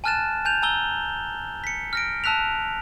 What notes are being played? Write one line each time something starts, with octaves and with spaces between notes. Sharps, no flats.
G#5 A5 F6 F#6 A6 E7
G#5 G6 F7
G#5 A#5 E6 G7
B6 C#7
F6 A#6 D7
A5 E6 F#6 B6 F7